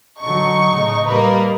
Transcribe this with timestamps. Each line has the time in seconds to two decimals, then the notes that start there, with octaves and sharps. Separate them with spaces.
0.22 D3 F#3 D#4 C#6
0.72 A2 C#3
1.08 G3 A#3 A#4 B4